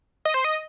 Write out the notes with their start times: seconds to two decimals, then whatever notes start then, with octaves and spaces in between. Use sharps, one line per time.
0.25 D#5
0.34 C5
0.44 D#5